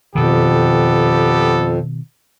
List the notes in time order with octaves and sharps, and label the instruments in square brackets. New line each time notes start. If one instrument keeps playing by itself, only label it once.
[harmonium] F2 [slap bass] B2 D#3 [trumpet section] B3 G4 A4